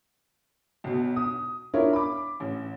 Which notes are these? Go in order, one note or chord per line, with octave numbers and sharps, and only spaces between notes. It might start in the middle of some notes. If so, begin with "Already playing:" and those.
B1 B2
D#6
D4 E4 F4 A#4 C#5
B5 D6
A1